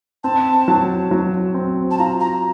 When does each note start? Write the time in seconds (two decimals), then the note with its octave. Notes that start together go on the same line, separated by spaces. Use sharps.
0.24 C4 A5
0.68 F#3
1.11 F#3
1.54 C4
1.91 A5
1.99 F4 A#5
2.20 A#5